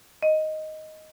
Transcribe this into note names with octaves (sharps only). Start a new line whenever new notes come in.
D#5